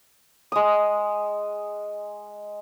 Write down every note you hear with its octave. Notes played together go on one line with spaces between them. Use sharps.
G#3 D#6